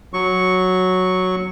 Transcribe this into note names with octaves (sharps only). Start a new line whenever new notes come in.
F#3 C#6